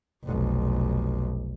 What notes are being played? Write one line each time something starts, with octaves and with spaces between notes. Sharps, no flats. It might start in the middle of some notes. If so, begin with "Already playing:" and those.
F1 B1